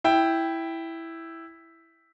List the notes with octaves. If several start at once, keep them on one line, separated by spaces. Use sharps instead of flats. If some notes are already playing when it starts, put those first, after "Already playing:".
E4 G5